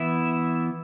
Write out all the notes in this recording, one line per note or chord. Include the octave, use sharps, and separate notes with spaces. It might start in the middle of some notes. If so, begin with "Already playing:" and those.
Already playing: E3 B3 E4 E5